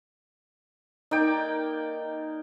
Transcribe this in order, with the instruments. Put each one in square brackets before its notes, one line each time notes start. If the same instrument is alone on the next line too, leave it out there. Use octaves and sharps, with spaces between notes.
[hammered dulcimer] A#3 D5 G5 [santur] D#4